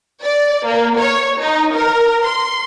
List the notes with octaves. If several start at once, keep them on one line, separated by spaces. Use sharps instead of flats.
D5
A#3
C#5
D#4
A#4
C6